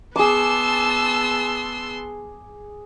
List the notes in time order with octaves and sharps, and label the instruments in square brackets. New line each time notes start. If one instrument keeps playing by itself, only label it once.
[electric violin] B3 C6 [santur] G#4 D6 [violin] A5 E6